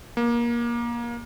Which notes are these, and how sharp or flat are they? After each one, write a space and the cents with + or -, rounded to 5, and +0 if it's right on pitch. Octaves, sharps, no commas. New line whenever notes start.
A#3 +25